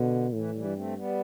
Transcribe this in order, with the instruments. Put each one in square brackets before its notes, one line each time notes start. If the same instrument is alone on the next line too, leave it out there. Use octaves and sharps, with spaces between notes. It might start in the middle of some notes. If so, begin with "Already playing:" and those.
Already playing: [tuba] B2 [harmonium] D3
[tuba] A2 [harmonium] E3
[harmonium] E3 G3
[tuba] G2
[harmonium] A3 C4
G3 B3